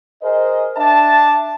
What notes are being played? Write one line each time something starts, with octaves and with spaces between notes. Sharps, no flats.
G#4 A#4 C5 D#5
D4 E5 A5